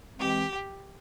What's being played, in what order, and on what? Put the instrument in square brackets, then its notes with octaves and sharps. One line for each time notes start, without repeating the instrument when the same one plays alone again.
[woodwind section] E3 G#3 C4 [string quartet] G4